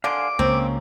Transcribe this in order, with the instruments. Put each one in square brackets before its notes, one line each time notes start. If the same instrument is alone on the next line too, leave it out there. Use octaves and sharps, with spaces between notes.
[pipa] D3 D4 [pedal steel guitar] F5 G#5 C6 [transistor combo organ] D6
[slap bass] C#2 [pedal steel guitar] A#3 C#4 [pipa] C4